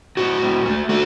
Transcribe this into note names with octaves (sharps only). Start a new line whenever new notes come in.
A2 F#4
A2
A3
A3 F#4